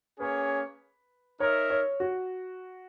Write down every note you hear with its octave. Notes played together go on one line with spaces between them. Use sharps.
A#3 C#4 G#4 B4 C#5
D#4 A#4 C#5 E5
C#5
F#4